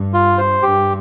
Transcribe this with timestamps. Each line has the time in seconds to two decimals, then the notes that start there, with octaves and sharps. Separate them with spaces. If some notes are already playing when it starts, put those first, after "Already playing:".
Already playing: G2
0.14 F4
0.38 C5
0.62 G2 G4